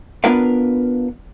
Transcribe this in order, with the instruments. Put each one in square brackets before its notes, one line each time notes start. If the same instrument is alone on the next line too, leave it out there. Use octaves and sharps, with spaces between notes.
[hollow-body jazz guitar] B3 D4 F4 A#4 B4 F5